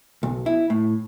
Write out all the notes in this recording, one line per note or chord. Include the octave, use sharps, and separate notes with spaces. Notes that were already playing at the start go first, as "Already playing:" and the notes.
B1
E4
A2